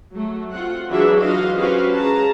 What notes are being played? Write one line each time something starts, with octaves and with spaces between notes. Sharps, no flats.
F#3 A3
C4 F4 F#5
E3 F#3 D4 E4 G#4 E5
F4 F#4 D#5 F5
C#4 F#4 G4 B4 C5 F5
G#4 A5 A#5